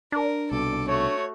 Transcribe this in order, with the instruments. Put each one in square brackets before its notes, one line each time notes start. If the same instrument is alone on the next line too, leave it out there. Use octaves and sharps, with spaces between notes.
[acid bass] D4 [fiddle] A#4
[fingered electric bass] C2 B2 [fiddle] A4 D6
[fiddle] A3 F#4 [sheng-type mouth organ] C#5